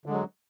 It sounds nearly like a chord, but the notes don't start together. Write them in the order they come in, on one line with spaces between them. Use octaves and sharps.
D3 G#3 F#3